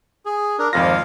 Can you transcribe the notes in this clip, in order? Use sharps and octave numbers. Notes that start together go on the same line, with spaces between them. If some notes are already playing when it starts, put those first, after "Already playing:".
G#4
D4 A#4
G#1 F2 F4 F5 A#6